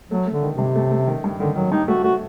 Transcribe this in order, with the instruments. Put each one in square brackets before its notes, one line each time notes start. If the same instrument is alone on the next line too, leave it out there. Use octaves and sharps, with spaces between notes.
[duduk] F#3 [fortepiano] A3
[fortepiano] A3
[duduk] D3
[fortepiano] D#3
[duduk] C3
[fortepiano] G2
A3
A3
D#3
G2
[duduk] D3 [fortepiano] D#3
[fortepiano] D#3 [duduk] F#3
[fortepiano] G2 [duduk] D#4
[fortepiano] A3 [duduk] F#4
[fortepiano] A3 [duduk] F#4